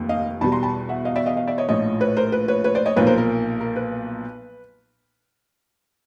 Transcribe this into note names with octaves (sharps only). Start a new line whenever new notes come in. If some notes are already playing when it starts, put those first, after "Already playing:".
Already playing: F1 D#2
D#5 F5
E2 B2 G3 A5 B5
A#5 C6
A5 B5
E5 F#5
D#5 F5
D5 E5
D#5 F5
D#5 F5
D5 E5
C#5 D#5
A#1 A2 F3 C#5 D#5
B4 C#5
A#4 C5
B4
B4 C#5
B4 C#5
C5 D5
C#5 D#5
B1 A#2 F3 A#3 B4 C#5
A#4 C5
A#4
A#4
B4